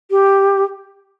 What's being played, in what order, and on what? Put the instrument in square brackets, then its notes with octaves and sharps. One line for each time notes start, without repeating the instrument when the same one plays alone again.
[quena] G4